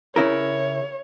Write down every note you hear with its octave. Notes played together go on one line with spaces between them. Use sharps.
C#3 E4 A#4 C#5